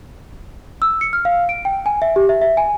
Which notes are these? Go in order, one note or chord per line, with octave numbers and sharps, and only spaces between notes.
E6
C#7
F6
F5
D7
G5
G#5
E5
G4
E5
E5
G#5